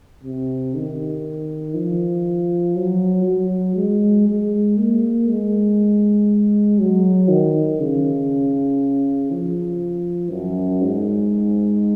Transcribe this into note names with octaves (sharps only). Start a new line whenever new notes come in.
C3
D#3
F3
F#3
F#3
G#3
G#3
A#3
G#3
F#3
D#3
C#3
F3
F#2
G#2